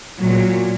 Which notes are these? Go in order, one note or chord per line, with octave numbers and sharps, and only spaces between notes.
A#2 F#3